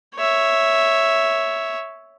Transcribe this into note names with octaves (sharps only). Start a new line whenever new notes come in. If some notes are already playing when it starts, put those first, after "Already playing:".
C#5 E5